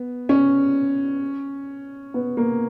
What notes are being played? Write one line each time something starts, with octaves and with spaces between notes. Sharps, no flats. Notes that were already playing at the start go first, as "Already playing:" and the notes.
Already playing: B3
C#4
B3
A#3